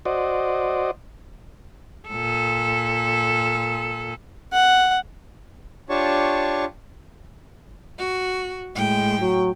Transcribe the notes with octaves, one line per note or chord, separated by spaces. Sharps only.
F#4 C5 D5 D#5
A#2 A4
F#5
D4 F4 G4 C#5 A5 C#6
F#4
A2 G#3 G5
F#3